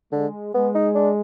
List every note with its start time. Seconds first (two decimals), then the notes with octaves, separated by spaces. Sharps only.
0.12 D3 G#3
0.54 G#3 B3
0.75 D#4
0.95 D4